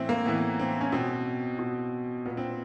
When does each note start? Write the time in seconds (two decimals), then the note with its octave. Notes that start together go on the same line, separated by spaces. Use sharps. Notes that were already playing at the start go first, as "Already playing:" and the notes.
Already playing: A2 E3 C4 E4
0.09 A#3
0.26 A2 E3 B3
0.59 C4
0.81 C#4
0.92 B2 C4
1.59 B2
2.26 A#2 B3
2.37 C4